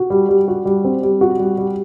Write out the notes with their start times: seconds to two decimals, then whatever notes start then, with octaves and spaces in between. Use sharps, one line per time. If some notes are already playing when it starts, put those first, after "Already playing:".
Already playing: F#4
0.10 G3
0.29 G3
0.48 F#4
0.65 G3
0.84 C4
1.03 G3
1.21 F#4
1.40 G3
1.58 G3